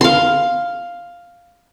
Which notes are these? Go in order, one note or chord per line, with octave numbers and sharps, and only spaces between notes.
F5 C6